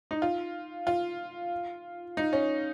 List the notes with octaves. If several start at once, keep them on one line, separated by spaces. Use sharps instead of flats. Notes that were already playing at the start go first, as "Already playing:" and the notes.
D#4
F4
F4
D#4
C#4